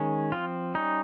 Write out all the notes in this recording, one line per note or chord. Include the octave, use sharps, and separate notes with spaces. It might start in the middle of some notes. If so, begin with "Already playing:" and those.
Already playing: D#3 G#3 C#4
F3 C4 F4
G3 C#4 D#4